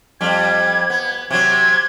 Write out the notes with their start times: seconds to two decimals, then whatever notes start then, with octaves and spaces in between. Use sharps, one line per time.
0.21 F2 G3 G#6
0.90 B3
1.31 C3 F#3 G#6